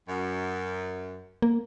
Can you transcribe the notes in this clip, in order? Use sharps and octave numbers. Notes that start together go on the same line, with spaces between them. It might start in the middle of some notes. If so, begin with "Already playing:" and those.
F#2
A#3